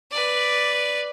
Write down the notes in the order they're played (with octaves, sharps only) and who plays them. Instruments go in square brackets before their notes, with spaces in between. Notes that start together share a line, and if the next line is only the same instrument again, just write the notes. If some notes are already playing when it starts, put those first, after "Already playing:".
[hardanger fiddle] B4 D5